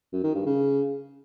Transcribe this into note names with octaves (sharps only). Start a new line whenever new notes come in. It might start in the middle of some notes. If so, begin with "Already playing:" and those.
F#2
D#3
G2
C#3